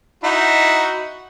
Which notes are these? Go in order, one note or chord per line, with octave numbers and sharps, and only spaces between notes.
D#4 E4 F#4